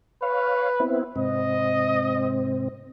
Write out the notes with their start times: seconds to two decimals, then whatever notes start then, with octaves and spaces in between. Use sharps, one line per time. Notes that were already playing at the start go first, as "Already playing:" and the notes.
0.22 B4 C#5 F5
0.80 B3 C4 E4
1.16 G#2 C3 C4 D#5